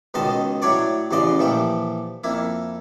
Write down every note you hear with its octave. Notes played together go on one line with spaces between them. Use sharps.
C#2 B2 D#3 D#5 A5 C6
A2 F#3 D4 C#5 D5
A1 E2 C#3 D5 D#5 C6
A#2 E3 F3 G4
F2 A#3 E4